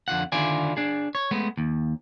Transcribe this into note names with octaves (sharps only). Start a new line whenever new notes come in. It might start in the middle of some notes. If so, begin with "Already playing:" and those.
F2 D3 F4 F#5
D3 D#3 E4 F4 D5 G#5
D4 G#4
C#5
G#3 A3 B3
D#2